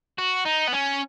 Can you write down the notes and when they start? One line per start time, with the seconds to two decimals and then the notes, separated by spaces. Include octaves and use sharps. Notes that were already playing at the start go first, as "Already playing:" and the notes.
0.18 F#4
0.45 D#4
0.67 B3
0.72 C#4